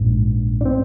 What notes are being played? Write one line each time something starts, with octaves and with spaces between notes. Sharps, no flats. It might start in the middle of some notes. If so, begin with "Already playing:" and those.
Already playing: A#1 G#2
D4
C4